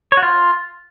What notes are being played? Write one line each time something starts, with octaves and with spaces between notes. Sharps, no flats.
C#5
F#4
F4